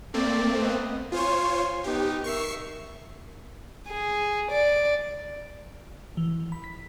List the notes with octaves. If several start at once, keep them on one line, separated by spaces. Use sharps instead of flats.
A3 A#3 C4 D5
B3 D#5
F4 C5 C#5 G#5 C6
B3 D#4 G4
A#4 E5 C#6 C7
G#4
D5
E3
B5
B6